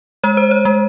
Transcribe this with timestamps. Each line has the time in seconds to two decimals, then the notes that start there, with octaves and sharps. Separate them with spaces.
0.24 G#3 C#5
0.37 C5
0.51 C#5
0.65 G#3